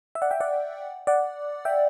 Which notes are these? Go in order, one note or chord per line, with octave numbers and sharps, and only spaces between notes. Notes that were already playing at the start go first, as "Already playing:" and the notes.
E5
D5 F#5
E5 G5
D5 F#5
D5 F#5
E5 G5